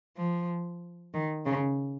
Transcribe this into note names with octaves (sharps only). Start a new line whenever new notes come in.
F3
D#3
C#3